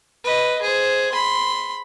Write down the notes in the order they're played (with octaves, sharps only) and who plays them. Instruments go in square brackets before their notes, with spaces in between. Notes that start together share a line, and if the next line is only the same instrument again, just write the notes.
[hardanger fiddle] B4 D#5
G#4 C5
B5 C6